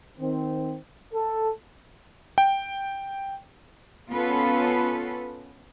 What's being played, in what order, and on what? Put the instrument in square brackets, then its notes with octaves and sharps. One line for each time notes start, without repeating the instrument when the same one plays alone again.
[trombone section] D#3 C4
A4
[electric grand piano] G5
[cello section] B3 C#4 F4 A4 B4